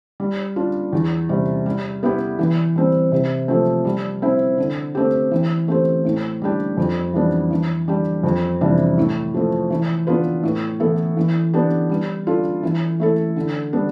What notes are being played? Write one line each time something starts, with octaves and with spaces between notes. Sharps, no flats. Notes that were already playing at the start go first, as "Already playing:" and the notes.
G3
D4 F4
E2
C3 G3
G3
B3 E4 G4 B4
E3
G3 C4
C3
F3 A3 C4
G3
C4 E4
D3
A3 C4 G4
E3
A3 C4 G4 C5
A2
G3 D4 G4
F2
E3 G3 B3 D4
E3
G3 D4 G4
F2
C3 E3 G3 D4
A2
F3 A3
E3
B3 D4 F4 B4
A2
E3 B3 E4 A4
E3
B3 D4 G4
G3
D4 F4 A4
E3
A3 E4 A4
D3
G3 B3 D4